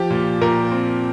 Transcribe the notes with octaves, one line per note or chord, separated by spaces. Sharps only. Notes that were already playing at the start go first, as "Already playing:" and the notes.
Already playing: F3 G4
A#2
A#2 A#4
C4